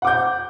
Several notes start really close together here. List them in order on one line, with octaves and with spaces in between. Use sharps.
F#5 D6 G6